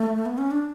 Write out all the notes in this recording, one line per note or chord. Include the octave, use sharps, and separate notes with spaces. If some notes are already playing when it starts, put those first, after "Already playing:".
Already playing: A3
B3
C#4
D4